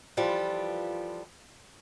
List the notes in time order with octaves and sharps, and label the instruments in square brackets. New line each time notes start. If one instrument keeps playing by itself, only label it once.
[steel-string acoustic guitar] E3 F3 G3 F4 A4 B4